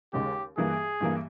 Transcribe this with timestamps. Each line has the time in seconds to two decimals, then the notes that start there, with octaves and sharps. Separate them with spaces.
0.13 D#2 C#3 G#3 C#4 G4
0.57 G2 E3 A#3 G#4
1.00 G2 E3 A#3